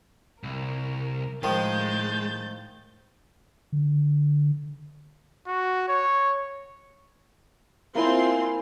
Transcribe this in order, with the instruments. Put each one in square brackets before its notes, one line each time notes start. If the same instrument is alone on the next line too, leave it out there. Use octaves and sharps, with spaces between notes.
[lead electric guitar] C2 [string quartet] A#4
[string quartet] A2 G6 A6 [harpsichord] D#3 F3 [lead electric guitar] G#3
[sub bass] D3
[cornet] F#4
C#5
[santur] A#3 E4 G#5 [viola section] C4 F4 C6